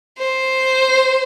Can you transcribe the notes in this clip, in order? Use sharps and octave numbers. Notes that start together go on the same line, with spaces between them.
C5